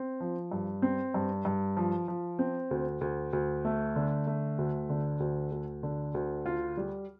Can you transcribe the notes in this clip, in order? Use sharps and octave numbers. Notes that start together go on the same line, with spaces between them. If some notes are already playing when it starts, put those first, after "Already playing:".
Already playing: C4
F3
G2
C4
G2
G2
F3
F3
C4
D2
D2
D2
A3
D3
A3
D2
D3
D2
D2
D3
D2
F4
G3